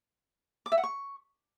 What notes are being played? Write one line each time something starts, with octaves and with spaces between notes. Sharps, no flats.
D6
E5
F#5
C#6